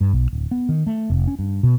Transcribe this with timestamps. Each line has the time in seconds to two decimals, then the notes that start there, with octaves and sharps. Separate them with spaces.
0.01 G2
0.13 B1
0.33 D1
0.51 B3
0.69 D#3
0.87 A3
1.10 F1
1.27 C#4
1.39 G2
1.63 B2